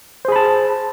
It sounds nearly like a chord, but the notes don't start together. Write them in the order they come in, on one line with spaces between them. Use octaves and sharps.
C5 G#4 B5 A5